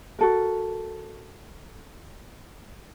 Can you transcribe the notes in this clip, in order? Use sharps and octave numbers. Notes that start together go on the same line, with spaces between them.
F#4 A4 A#4